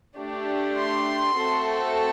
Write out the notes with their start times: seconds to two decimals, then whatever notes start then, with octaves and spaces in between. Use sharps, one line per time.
0.16 A3 D4 G4
0.76 C6
1.36 A3 C4 F#4 A4